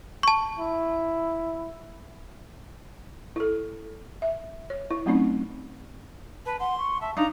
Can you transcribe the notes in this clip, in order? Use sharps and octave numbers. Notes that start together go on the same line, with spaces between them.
A5 C#6
E4
E4 A4
E5
C#5
E4
F#3 A3 C4 C#4 D#4
B4 A5
F#5 C6
C#6
E5 A5
D4 D#4 F5 A#5